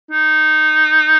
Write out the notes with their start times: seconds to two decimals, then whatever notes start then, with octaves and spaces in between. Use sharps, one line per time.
0.11 D#4